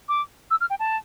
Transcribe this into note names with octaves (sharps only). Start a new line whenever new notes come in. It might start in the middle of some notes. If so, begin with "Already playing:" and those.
D6
E6
F6
G5
A5